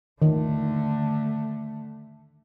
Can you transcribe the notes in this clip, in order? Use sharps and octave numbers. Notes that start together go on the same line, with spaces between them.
D3 D#3 A3